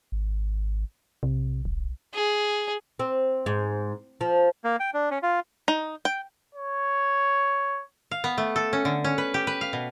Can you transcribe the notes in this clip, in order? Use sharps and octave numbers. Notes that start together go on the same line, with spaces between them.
G#1
B1 C3
D#1
G#4
C4
G#2
F3
A#3
G5
D4
C#4
F4
D#4
G5
C#5
F5
B3
A3
A4
C#4
D3
C#4
B4
G4
B4
F5
B2